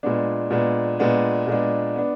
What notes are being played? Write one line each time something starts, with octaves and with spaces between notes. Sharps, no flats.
A#2 G#3 B3 D4
A#2 G#3 B3 D4
A#2 G#3 B3 D4
A#2 G#3 B3 D4
B3 D4